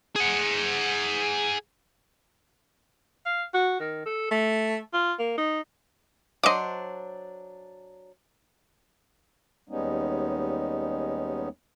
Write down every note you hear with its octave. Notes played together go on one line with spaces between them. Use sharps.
G#4 F#5
F5
F#4
D#3
A4
A3
F4
A#3
D#4
F#3 D4 C5 D#5 D6
D#2 G3 G#3 B3 C#4 D#4